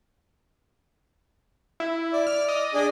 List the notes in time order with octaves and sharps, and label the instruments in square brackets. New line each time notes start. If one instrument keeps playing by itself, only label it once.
[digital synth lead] E4
[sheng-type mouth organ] D5
[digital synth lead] F6
D#5
[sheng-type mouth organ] D4 G#4 D5